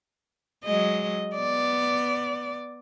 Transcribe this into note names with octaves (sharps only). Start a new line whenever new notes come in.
F#3 G#3 D#5
B3 D5